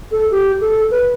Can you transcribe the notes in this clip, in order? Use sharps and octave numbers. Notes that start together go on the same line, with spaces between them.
A4
G4
A4
B4